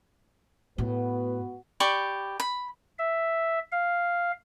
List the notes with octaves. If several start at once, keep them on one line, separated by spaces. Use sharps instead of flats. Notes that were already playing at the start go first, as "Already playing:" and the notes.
A2 B3 F#4 B4
G4 D5 B5 C#6
B5
E5
F5